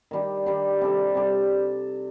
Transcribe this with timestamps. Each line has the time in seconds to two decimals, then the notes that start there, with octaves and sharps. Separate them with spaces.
0.11 D#3 G3 D4 G4
0.46 D#3 G3 D4 G4
0.81 C3 G3 D4 A4
1.15 C3 G3 D4 A4